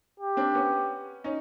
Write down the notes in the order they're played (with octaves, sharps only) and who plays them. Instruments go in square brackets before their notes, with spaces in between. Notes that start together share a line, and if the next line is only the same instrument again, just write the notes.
[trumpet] G4
[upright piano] C4 D4
B3 C#4
C#4 D#4